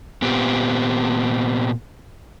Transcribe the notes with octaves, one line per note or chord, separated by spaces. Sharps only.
A#2 B3 C4 G4